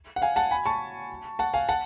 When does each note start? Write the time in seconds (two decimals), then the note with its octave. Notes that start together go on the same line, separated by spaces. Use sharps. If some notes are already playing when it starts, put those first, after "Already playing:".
0.16 F#5
0.22 F5 G#5
0.36 F#5 A5
0.51 G#5 B5
0.66 A5 C#6
1.39 F#5 A5
1.54 F5 G#5
1.69 F#5 A5